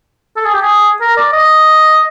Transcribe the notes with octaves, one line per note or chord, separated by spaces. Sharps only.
A4
G#4
G4
G#4
A#4
D5
D#5